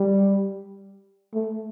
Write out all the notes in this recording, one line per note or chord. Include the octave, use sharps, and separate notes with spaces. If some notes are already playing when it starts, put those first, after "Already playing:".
Already playing: G3
A3